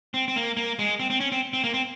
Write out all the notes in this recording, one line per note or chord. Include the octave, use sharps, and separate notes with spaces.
C4
C4
A#3
A#3
G#3
C4
C4
C#4
C4
C4
A#3
C4